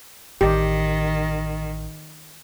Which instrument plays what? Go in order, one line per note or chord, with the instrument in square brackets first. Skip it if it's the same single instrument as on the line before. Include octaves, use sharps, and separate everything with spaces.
[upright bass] A1 [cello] D#3 [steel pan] G4